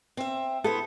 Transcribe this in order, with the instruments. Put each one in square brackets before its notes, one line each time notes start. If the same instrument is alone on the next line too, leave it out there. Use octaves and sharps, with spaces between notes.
[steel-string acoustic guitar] C4 E5
[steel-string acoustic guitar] B3 E4 C5 [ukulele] A4